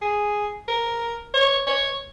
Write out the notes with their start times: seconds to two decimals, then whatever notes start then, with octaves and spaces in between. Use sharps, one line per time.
0.02 G#4
0.68 A#4
1.34 C#5
1.67 C#5